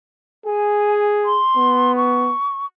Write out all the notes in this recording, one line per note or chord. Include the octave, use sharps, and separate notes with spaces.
G#4 G#5
C6
B3
C#6